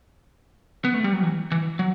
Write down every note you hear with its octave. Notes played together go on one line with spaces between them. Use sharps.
B3
A3
G3
F#3
E3
E3
F#3